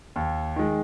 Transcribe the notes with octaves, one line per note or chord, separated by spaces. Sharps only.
D#2
D#3 G#3